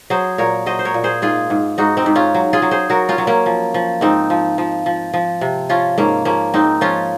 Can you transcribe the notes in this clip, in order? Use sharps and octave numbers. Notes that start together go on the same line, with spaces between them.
F#3 G#4 C5
A#2 A#4 C#5
F#3 C5 D#5
C5
A#4 C#5
A#2
G#4 C5
G#2 F4 G#4
G#2
G#2 D#4 F#4
C4 D#4
G#2
C#4 F4
F#3
F4 G#4
F#3
G#4 C5
F#3 F#4 A#4
C#4 F4
F#3
A#3 C#4
F3
F3
G#2 C4 D#4
F3
F3
F3
F3
C3
F3 C#4 F4
G#2 A#3 C#4
F3 A#3 C#4
G#2 C4 D#4
F3 C#4 F4